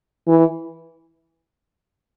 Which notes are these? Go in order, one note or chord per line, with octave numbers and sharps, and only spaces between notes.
E3